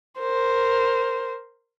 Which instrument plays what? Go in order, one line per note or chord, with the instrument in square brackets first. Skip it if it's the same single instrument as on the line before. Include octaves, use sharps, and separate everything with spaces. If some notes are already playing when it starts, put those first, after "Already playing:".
[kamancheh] A#4 C5